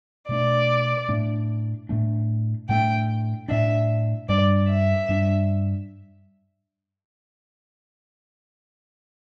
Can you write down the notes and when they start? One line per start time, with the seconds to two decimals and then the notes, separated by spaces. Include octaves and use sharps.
0.29 B2 A3 D4 D5
1.09 A2 A3 D4
1.89 A2 A3 D4
2.69 A2 A3 D4 G5
3.49 A2 A3 D4 E5
4.29 G2 G3 D4 D5
4.69 E5
5.09 G2 G3 D4